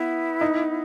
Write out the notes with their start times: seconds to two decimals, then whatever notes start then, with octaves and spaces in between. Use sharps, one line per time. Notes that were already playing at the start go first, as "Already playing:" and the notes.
Already playing: B3 E4
0.41 D#4